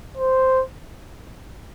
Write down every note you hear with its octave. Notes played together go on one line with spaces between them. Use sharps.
C5